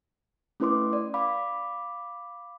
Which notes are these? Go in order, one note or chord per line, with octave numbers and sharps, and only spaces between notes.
A3 C#4 E4 B4 C6 D6
D5
F5 B5 D6